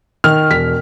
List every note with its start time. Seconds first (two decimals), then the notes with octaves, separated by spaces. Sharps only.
0.24 D#3 F6
0.50 E1 B6